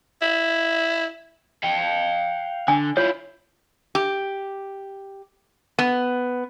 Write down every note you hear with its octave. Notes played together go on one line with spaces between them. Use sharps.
E4
F5 G5
D3 G#5
E4 F4 C#5
G4
B3